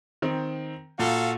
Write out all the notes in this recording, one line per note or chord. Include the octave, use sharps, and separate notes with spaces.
D#3 C4
A#2 F#4 A4 F5